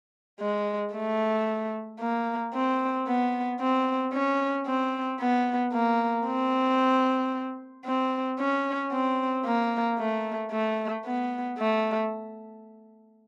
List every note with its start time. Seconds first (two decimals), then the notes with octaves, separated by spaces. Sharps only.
0.40 G#3
0.94 A3
2.00 A#3
2.54 C4
3.07 B3
3.60 C4
4.13 C#4
4.66 C4
5.20 B3
5.73 A#3
6.26 C4
7.86 C4
8.39 C#4
8.92 C4
9.45 A#3
9.99 A3
10.52 A3
11.06 B3
11.58 A3